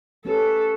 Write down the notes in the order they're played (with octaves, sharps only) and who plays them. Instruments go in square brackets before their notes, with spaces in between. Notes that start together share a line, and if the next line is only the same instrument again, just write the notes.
[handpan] A3 C#4 G4 B4 [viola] A4